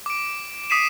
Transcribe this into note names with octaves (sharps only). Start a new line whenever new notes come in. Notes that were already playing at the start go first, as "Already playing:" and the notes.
D6 D7
D6 D#6 B6 C7 D#7 E7